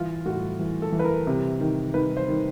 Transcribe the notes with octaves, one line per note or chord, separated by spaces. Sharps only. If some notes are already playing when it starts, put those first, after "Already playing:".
Already playing: E3 F4
A2 F#4
E3
A4
E3
B4
A#4
C3
D#3
D#3 B4
C5
D#3